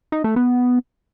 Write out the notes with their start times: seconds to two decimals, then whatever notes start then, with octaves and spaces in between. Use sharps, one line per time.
0.12 D#4
0.24 A3
0.36 B3